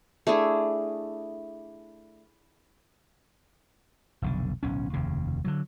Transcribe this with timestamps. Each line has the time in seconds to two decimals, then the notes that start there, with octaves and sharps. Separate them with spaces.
0.27 A3 D4 E4 G#4
4.22 F1 B1 D3
4.63 D1 B1 C#4
4.93 F1 D#2 C#3
5.45 D3 D#3 F#3